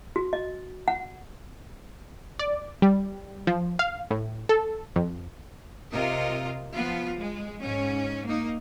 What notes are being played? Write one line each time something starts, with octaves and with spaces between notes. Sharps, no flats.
F#4
D#5
F#5
D5
G3
F3
F5
A2
A4
F2
C3 F4 A#4 D#5
F3 B3 F4
G#3
G#2 C#4
A#3 D#4